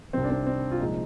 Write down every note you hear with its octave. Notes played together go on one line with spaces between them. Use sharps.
C2 C3 D#3 C4
D4
C4
C4
F4
C2 A#2 F3 G#3 D#4